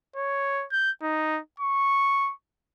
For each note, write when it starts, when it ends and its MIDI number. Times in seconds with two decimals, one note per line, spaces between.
0.16 0.65 73
0.72 0.91 91
1.02 1.39 63
1.60 2.32 85